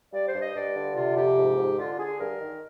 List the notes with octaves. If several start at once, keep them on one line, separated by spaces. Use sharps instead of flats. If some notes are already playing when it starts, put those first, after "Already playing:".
G2 D5
C5
G2
D#5
G2 D5
D3
C3 F4
F2 G4
G#2
G#2
D3 F4
D3 G#4
G2 A#4
D#3